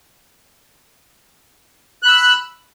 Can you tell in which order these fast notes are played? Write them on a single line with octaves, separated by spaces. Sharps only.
F#6 B5 E6